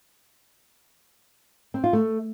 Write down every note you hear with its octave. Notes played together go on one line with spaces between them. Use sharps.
C4
F4
A3